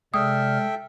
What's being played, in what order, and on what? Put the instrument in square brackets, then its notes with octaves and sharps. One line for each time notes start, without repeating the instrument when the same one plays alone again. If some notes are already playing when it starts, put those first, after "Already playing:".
[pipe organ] C3 D5 F6 [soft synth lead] G#3 [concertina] A4 E5 G5 [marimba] D#6